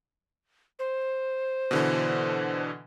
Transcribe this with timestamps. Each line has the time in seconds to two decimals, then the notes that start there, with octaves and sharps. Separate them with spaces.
0.79 C5
1.71 B2 D3 E3